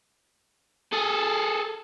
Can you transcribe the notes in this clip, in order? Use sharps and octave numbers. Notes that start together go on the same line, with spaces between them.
G#4 A4